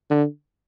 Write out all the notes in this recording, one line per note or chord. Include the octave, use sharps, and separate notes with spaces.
D3